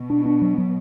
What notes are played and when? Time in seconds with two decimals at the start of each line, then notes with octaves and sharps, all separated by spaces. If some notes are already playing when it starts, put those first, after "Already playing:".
Already playing: B2
0.10 D4
0.26 D4
0.42 F#3
0.58 F#3